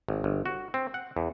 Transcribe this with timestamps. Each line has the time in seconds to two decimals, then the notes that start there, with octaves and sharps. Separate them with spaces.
0.09 G#1
0.24 G1
0.46 F#4
0.74 C4
0.94 F#5
1.17 E2